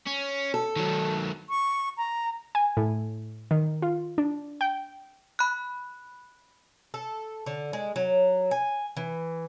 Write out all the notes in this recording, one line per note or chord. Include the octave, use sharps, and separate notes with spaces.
C#4
A4
D#3 F#3
C#6
A#5
G#5
A2
D#3
F4
D4
G5
B5 F#6
A4
D3
G#3
F#3
G#5
E3